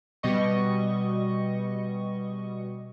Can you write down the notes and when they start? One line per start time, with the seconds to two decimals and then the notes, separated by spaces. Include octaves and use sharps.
0.23 B2 G3 D#5 C#6